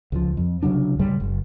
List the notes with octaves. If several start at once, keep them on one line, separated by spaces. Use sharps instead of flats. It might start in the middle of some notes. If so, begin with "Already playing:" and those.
C#2 F3
F2
C2 C#3 F#3 D4
G#2 C#3 G3 G#3
F#1